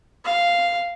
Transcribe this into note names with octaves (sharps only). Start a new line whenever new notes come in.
F5